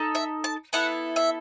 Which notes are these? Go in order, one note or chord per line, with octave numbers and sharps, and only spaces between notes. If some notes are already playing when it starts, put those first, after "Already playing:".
Already playing: D#4 A4
E5
A5
B3 E4 A4 F#5
E5